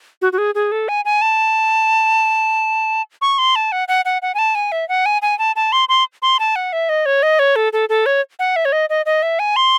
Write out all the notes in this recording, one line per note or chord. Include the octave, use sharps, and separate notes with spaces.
F#4
F#4
G#4
G#4
A4
G#5
G#5
A5
C#6
C6
A5
F#5
F#5
F#5
F#5
G#5
A5
G#5
E5
F#5
G#5
G#5
A5
A5
C6
C6
C6
A5
F#5
E5
D#5
C#5
D#5
C#5
A4
A4
A4
C#5
F#5
E5
C#5
D#5
D#5
D#5
E5
G#5
C6